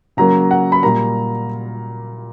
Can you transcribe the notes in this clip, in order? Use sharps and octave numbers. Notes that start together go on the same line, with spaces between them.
C#3 F#3 A#3 A#5
F#5
B5
A#2 G3 A#3 A#5